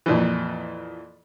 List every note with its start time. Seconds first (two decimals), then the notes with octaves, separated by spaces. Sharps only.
0.06 F2 A#2 E3